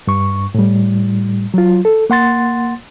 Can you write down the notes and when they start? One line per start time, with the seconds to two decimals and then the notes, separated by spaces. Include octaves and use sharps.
0.07 G2 C#6
0.54 A2 G3
1.54 F#3 F4
1.85 A4
2.10 A#3 F#5 C6 A6